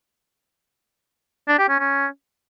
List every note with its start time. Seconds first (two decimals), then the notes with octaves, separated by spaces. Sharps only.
1.48 D4
1.58 G4
1.69 C#4
1.79 C#4